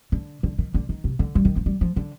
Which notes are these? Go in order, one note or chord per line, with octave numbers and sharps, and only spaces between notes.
D3
D3
D#3
D3
D#3
C3
D3
G3
D#3
F3
G3
F3
D3